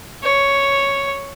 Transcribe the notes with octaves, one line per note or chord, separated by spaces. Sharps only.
C#5